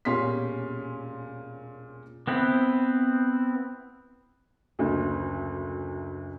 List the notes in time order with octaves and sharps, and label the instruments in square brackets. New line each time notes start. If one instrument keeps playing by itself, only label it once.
[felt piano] E1 A#2 C#4 G4 C6 B6
[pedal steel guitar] B3 C4 E4
[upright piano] F#1 D2